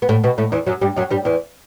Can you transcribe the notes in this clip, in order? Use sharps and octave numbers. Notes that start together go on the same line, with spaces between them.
B3
A2 A3
B2 B3
A2 A3
E2 E3
F#2 F#3
G2 G3
F#2 F#3
G2 G3
E2 E3